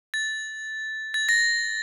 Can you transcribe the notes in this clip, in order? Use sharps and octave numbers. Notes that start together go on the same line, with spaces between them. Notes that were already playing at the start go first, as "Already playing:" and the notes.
A6
A6
A#6